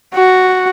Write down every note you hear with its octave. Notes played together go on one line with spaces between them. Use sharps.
F#4